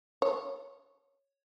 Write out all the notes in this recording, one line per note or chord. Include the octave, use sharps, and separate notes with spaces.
C#5